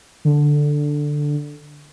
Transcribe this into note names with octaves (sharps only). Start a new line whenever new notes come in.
D3